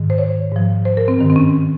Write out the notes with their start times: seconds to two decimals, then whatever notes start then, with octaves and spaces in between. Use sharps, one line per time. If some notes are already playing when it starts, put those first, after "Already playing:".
Already playing: G#2 D#3
0.10 C5
0.18 C#5
0.51 G#2 F3
0.85 C5
0.97 A#4
1.08 C4
1.19 G2 D#3
1.30 C4
1.36 C#4